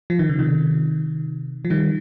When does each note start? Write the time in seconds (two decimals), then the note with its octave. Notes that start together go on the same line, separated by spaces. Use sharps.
0.10 F3
0.19 D#3
0.29 C#3
0.39 C3 D#3
1.65 F3
1.70 D#3 G3